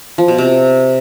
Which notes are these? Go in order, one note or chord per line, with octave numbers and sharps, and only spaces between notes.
F3
B2
C3